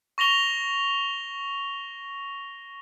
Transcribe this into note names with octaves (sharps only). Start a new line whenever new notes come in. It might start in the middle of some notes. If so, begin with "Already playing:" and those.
C#6 A#6 F7 G7